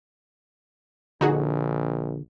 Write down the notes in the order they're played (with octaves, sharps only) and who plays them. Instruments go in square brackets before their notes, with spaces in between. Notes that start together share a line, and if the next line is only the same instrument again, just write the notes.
[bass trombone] A#1 [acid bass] D3 [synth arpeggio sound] D#4 F#4 G#4